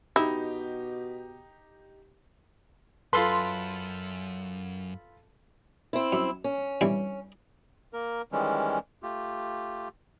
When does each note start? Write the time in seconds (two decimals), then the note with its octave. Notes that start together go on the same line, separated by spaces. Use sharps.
0.16 B2 D#4 E4 G4
3.13 F#2 F4 A4 B4 C6
5.93 C4 E4
6.12 F#2
6.44 C#4
6.81 G2 E3 C4
7.93 A#3 A#4
8.32 D#3 E3 G3 G#3 C#4
9.03 A3 F4 G4